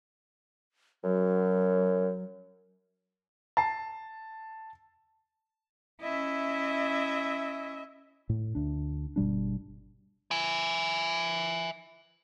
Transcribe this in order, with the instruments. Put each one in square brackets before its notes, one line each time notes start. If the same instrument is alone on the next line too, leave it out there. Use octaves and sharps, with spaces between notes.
[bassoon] F#2 [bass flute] F#3
[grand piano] A5 C7
[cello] C#4 E4 [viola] D#5 E5
[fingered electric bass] A2
D2 D4
G1 B2 G3 D4
[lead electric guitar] E5 G#5